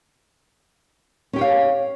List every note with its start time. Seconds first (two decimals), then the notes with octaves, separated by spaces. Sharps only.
1.33 C#4
1.36 G4
1.39 C#5
1.41 F5